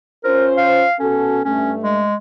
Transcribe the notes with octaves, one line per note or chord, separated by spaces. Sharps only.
C#4 F4 A#4 C5
F5
B2 C#4 F#4 A4
G2 A3 C#4
G#3